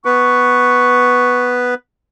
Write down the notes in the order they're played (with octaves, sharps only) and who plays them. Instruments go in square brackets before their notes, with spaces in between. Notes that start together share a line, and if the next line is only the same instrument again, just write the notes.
[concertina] B3 B4 [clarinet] C#6